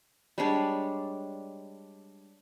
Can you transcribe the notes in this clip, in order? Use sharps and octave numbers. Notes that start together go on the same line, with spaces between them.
G3 G#3 D4 C#5